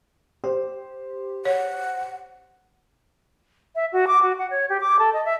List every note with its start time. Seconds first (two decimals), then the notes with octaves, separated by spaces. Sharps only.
0.44 G4 C5
1.45 C#5 F#5
3.75 E5
3.92 F#4
4.07 D6
4.22 F#4
4.38 F#5
4.50 C#5
4.69 G4
4.80 D6
4.99 A4
5.13 D#5
5.25 E5